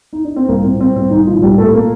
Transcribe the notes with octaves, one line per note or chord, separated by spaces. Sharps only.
D#4
D4
C4
C2 A#3
A#2 C4
G3 C4
C2 C4
C2 D#3 D#4
A#2 F3 F4
C2 G3 G4
A#2 A3 A4
A#3